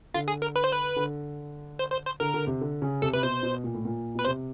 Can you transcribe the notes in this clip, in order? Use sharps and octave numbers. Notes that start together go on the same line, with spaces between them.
D3 F4
G#4
A#4
B4
C5
B4
D3
C5
C5
C5
D3 A#4
D3
C3
D3
C#3
C3 A4
C3 B4
B2 C5
B2
A#2
A2
A#2
B2 B4
C3 C5